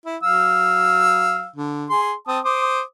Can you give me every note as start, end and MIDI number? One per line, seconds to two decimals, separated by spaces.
0.05 0.17 64
0.23 1.48 54
0.23 1.48 77
0.23 1.48 88
1.56 1.88 50
1.90 2.13 68
1.90 2.13 84
2.28 2.39 60
2.28 2.39 81
2.28 2.39 87
2.45 2.81 72
2.45 2.81 86
2.45 2.81 87